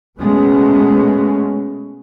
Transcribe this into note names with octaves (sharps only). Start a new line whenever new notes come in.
B2 G#3 A3 B3 C#4